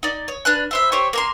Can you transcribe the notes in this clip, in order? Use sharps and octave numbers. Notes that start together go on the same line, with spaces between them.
D#4 D5
C#5
D4 B4 F6 F#6
E4 C5 E5
G4 C5 C#5 C#6
A#3 A#4 C6